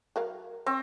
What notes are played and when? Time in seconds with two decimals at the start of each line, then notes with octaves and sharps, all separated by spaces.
0.16 F#3 A#4 F5
0.66 C4 C#5